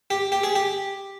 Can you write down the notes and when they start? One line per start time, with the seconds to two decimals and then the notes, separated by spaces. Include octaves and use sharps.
0.10 G4
0.32 G4
0.43 G#4
0.55 G4